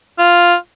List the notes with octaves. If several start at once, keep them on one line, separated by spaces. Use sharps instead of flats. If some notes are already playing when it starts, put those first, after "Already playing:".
F4